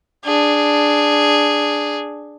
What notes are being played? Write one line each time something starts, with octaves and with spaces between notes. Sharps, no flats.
D4 G#4